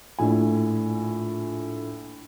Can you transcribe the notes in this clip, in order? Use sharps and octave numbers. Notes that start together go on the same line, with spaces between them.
A#1 A2 G#5